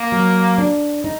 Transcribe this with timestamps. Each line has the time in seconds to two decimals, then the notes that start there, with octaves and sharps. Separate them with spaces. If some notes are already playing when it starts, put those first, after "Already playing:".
Already playing: A#3
0.12 F#3
0.58 D4
1.04 D#4